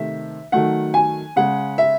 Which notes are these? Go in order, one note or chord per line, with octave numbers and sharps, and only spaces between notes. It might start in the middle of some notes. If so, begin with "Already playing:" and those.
Already playing: C3 D#3 A3 E5
D#3 F#3 A3 F#5
G#5
C#3 G#3 F#5
E5